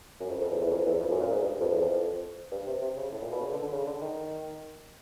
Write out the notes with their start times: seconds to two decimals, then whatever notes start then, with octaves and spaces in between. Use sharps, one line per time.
0.20 F#2
0.30 F2
0.41 F2
0.51 E2
0.61 E2
0.71 F2
0.86 E2
1.01 F2
1.11 F#2
1.20 A#2
1.31 G#2
1.42 G2
1.61 F2
1.72 E2
1.82 F2
2.52 G2
2.67 C3
2.82 C3
2.97 C#3
3.12 A2
3.22 A#2
3.32 B2
3.41 C#3
3.52 D3
3.62 D3
3.72 C#3
3.87 D3
4.02 D#3